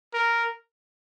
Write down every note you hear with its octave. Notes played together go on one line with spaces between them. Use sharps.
A#4